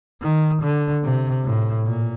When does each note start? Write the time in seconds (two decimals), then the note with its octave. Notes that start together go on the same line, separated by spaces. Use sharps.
0.22 D#3
0.62 D3
1.04 C3
1.45 A2
1.85 A#2